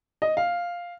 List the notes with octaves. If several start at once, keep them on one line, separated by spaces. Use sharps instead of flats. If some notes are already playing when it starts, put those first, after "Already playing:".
D#5
F5